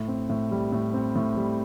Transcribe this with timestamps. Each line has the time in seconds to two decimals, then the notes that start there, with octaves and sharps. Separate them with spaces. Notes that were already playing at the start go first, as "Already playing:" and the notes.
Already playing: A2
0.08 C4
0.30 A2
0.51 G3
0.72 A2
0.94 C4
1.16 A2
1.37 G3